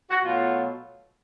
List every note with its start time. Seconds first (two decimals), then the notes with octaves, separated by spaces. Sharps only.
0.10 F#4
0.23 B2 F#3 A3 F4